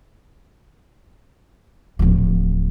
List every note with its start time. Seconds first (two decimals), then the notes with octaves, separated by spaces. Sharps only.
1.99 D1 F3